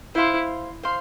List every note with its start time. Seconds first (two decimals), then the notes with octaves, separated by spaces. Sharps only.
0.15 E4 C5 F5 C6
0.83 C5 F5 C6